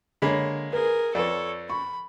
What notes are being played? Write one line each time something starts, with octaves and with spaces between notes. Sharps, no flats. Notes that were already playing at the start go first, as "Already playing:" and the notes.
D3 G#3 A#3 C#5 B5
G#4 A#4 B4
F2 A4 B4 C#5 D5
B5 C#6